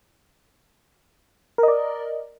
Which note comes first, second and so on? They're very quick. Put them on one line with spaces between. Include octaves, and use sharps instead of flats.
A#4 D#5 D5